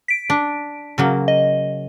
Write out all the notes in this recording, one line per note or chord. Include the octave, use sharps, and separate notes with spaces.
B6 D7
D4
C#3 F#3 A#3
D#5